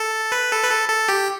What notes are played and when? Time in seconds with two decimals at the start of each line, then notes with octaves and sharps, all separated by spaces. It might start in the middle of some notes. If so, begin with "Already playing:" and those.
Already playing: A4
0.32 B4
0.52 A4
0.63 B4
0.71 A4
0.89 A4
1.08 G4